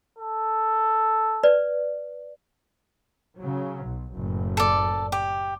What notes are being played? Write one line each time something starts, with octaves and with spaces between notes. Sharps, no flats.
A4
B4 D5
C#3 F#3
B1
F#1 A2
A4 D5
G4